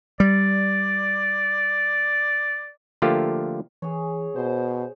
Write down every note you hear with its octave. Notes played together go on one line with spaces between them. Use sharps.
G3 D5
D3 F3 A3 A#3 F4 G4
E3 G#4 C#5
B2 C5